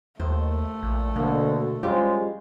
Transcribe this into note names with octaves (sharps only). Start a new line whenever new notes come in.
D#2 A3 C5
A#1
D2 B2 D3 A#3
G3 G#3 C#4 F4 G4 C5